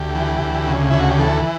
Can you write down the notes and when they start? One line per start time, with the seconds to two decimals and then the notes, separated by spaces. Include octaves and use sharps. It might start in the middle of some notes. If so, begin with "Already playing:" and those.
Already playing: D2 G4
0.15 E3
0.41 D2
0.68 C#3
0.90 D2 E4
1.00 F#4
1.10 G4
1.19 E3 A4